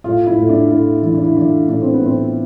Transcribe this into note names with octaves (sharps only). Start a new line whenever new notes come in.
A2 F4
E4
A2
D4
A2 E4
E3 E4
D4
E4
E3 D4
A2 D4
C4
B3
A2 C4